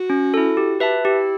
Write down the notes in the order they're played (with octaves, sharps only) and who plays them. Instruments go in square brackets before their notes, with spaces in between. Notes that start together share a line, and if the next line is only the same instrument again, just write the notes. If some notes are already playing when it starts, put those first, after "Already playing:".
Already playing: [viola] F#4
[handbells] C#4
E4 A4
G4
B4 E5 A5
[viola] E4 [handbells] G4